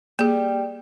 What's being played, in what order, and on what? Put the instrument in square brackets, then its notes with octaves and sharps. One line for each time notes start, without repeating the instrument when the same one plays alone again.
[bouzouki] G3 [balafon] A#3 G#4